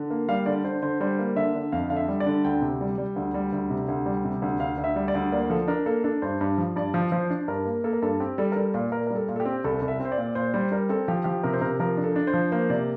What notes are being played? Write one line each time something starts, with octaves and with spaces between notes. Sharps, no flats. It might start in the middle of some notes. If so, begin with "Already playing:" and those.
Already playing: D3
A#3
G3 F5
D3 D5
D3 C5
D3 C5
G3 C5
A#3
D3 E5
D3
F2 F5
D3 F5
E5
G3
D5
D3
D2 G5
C3
G3
G3
D2
G3
D2
C3
D2
G3
C3
D2
D2 F5
D2
E5
G3
D5
D2
A#3 D5
F3 A4
D4 A#4
A#3 A4
D4 A4
G2 C5
G2
F3
G2 D5
F3
F3 C5
D4
G2 A#4
A#3
A#3 A4
A#4
G2 A4
C4 G4
G3 A4
A#4
G3 A4
A#2
A#2 A#4
A#4
G3
A4
A#2
A4
G4
C4
C2 A4
C2
E5
C4
C5
D5
A#2
A#2 C5
G3 C5
G3 A#4
C4 A4
F3 G4
F3 G4
C3 A#4
C5
C3 A#4
F3 A#4
D4
A4
D4
C5
F3
A#3 C5
C3 D5